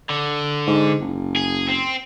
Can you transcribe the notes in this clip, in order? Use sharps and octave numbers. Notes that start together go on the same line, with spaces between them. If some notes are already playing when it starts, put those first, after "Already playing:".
D3
G#2
F#1
G#4
C4